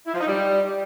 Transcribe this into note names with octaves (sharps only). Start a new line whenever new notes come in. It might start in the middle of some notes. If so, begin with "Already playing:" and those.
E4
F3
D#4
G3